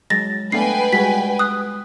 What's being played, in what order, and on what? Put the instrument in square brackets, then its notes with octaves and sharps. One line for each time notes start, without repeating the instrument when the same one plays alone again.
[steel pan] F#3 G#3 [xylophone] A6 A#6
[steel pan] A3 B3 D4 [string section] B4 G5 G#5 [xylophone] C7
[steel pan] G3 G#3 F#4 [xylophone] B6
[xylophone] D#6 F#6